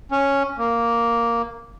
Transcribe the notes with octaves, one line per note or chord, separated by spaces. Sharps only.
C#4
A#3